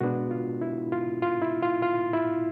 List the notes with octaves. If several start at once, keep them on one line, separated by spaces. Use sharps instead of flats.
B2 G#3 B3 D4 F#4
F4
E4
F4
F4
E4
F4
F4
E4